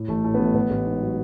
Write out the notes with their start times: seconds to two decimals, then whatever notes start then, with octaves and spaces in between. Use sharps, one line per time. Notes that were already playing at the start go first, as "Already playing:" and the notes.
Already playing: A2
0.08 A1 A3
0.24 A2 A3
0.34 B3
0.39 A1 A3
0.55 A1 B3
0.70 A1
0.86 G#2
1.01 F#3